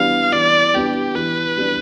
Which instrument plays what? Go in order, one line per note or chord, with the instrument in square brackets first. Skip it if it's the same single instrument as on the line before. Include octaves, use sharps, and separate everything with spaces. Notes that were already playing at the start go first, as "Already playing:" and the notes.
Already playing: [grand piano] E3 G3 B3 D4 [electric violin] F5
[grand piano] E3 [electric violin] D5
[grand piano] G3 B3 D4 [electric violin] G4
[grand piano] E3 [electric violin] B4
[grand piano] G3 B3 D4